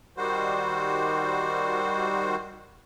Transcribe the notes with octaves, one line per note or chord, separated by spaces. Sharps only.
D#3 G3 F#4 C5